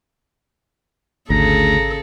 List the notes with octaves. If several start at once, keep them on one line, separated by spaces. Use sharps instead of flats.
G#1 D2 C#3 G#4 A4 A#5